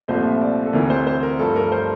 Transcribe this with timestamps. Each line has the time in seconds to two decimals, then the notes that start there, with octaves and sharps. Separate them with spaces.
0.08 C2 A#2 F3 A3 C5
0.25 E5
0.41 D5
0.66 A4
0.73 D2 C3 E3 A#4
0.90 C5
1.07 C5
1.23 A#4
1.39 G2 F3 A3 A4
1.56 A#4
1.72 C5